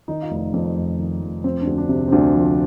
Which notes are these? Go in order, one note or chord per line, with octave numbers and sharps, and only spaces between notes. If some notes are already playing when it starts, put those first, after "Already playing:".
D#3 D#4
F4
F1
D#4
F2
F1
D#3
F1
F3 C4
D4
D2
D4
C3
C4
D2 D4
F3